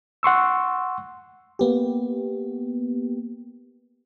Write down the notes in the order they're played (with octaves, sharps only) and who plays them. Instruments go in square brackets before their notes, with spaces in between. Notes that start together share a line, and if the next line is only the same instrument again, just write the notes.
[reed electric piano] F#5 C6 C#6 E6
[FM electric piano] A#3 B3 G4